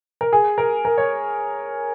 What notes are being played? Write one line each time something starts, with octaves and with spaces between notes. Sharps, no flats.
A#4
G#4
A#4
A#4
C#5